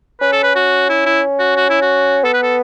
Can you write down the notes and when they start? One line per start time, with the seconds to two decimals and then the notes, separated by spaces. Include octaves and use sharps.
0.21 C#4 B4
0.32 A4
0.43 B4
0.56 F#4
0.89 E4
1.06 E4
1.39 F#4
1.57 F#4
1.70 E4
1.82 F#4
2.24 B3 A4
2.34 B4
2.43 A4